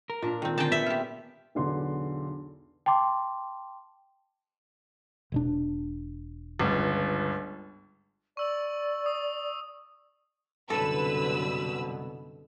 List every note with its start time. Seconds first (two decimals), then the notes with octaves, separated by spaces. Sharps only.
0.10 A#4
0.22 A#2 D4
0.42 D#3 C4
0.58 D3 C4 D#4 G#4 G5 A5
0.72 B3 E5
0.86 F4 G4
1.55 B1 E2 D3 C6
2.86 G5 A5 C6 D6
5.32 E1 B2 D4
6.59 G1 C#2
8.37 D5 C#6 E6 F#7
9.06 D#6
10.70 C2 F#2 B2 D3 A4 B4 E6